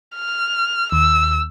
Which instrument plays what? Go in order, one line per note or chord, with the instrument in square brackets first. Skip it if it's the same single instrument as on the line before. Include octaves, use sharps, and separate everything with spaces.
[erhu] F6
[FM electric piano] D#2 [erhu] E6